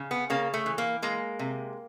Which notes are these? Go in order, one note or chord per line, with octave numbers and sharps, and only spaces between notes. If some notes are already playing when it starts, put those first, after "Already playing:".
Already playing: C#3
B3
C#3 A#3
A3
E3
A#3
G#3 A#3
C3